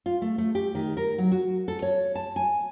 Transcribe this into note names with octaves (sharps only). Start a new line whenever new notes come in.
F4
A3
A3
G4
D#3
A#4
F#3
F#4
A4
C#5
A5
G#5